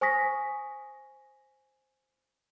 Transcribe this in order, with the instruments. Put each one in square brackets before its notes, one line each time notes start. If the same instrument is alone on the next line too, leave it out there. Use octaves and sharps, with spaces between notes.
[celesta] C5 G#5 C#6 D#6 A#6 B6